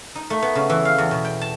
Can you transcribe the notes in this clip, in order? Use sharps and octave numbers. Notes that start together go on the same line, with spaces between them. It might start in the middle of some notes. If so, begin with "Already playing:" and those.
D#4
A3
B3
C#3
E3
F5
E2
B2
G5
A5